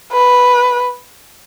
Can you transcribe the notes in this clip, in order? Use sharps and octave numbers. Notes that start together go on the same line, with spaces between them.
B4